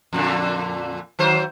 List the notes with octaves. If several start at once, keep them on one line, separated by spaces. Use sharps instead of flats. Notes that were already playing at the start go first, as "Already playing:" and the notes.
F2 A#2 D3
D#3 F#3 C5